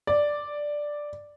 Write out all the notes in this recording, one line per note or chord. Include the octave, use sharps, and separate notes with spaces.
D5